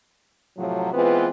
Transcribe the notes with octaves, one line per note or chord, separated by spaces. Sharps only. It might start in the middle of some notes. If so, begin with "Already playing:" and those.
A2 C3 F3 F#3
E3 G#3 B3 C4 F4 B4